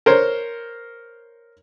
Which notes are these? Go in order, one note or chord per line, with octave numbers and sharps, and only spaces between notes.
A#4 C5 C#5